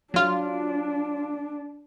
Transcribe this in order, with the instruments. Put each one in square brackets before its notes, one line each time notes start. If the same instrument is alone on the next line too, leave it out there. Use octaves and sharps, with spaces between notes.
[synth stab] F#3 F4 [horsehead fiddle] D4